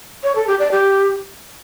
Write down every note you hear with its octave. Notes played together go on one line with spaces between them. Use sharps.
C#5
A4
G4
D5
G4